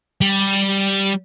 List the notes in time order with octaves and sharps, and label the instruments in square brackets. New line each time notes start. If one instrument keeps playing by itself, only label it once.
[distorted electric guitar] G3